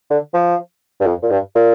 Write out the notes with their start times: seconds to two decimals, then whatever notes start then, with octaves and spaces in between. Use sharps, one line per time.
0.10 D3
0.34 F3
1.00 G2
1.06 F2
1.22 A#2
1.30 G2
1.55 A#2